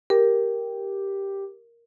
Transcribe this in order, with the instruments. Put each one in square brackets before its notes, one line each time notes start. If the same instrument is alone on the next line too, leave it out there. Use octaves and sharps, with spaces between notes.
[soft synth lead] G4 [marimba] A#4